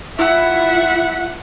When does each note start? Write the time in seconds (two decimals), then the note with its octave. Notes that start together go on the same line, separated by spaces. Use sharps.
0.19 E4 F4 E5 F#5